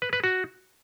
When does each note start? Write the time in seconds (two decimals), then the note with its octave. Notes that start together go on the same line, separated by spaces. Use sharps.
0.02 B4
0.13 B4
0.24 F#4